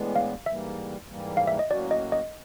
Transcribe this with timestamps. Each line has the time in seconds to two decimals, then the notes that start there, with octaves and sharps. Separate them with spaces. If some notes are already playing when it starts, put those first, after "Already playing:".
Already playing: A2 E3 G#3 B3 D4
0.16 F5
0.46 G#2 E3 G3 A#3 E5
1.08 G#2 E3 G3 A#3
1.37 F5
1.47 E5
1.59 D#5
1.70 A2 F#3 A#3 C#4 F#4 D5
1.91 D#5
2.12 D#5